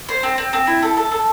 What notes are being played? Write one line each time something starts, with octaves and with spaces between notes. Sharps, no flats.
C5
C4
C4
C4
E4
A4
A4
A4